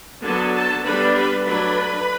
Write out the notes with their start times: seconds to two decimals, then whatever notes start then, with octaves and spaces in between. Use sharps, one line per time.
0.24 D3 F#3 B3 A4 A5
0.54 A4 A5
0.84 D3 G3 B3 D4 B4 B5
1.14 B4 B5
1.45 F#3 A3 D4 B4 B5